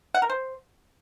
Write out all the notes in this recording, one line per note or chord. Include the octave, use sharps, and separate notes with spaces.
F#5
A#4
C5